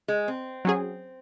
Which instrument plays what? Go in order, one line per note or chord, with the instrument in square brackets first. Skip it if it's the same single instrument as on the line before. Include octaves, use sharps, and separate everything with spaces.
[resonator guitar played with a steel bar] G#3
C4
[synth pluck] F#3 C#4 G#4